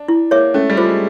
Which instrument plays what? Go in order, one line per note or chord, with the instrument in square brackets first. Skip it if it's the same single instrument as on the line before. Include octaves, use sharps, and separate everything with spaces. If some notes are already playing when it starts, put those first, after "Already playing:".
Already playing: [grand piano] D4
[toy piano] E4
[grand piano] A#3 [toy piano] G#4 C#5 E5
[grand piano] A3 [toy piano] C#4
[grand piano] G3
[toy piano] F4 G#4 C5
[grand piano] G#3